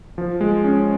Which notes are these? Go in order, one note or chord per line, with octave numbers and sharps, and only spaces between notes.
F3
G#3
C#4